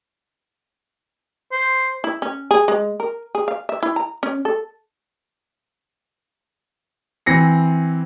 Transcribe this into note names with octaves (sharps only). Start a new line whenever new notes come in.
C5
E4
C#4
G#4
G#3
A#4
G#4
F5
E5
E4
A#5
C#4
A4
E3 C4 A#6 C7 C#7